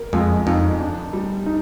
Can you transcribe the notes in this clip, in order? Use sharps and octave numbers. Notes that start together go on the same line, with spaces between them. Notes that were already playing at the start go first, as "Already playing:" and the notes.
Already playing: A#4
F2 G#3
F2 D#4
D4
G3
D#4